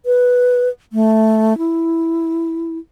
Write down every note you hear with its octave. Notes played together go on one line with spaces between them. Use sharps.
B4
A3
E4